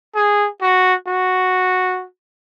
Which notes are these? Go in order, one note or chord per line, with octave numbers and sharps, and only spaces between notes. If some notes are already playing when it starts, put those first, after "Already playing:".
G#4
F#4
F#4